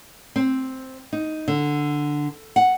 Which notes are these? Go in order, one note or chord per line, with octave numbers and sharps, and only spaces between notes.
C4
D#4
D3
F#5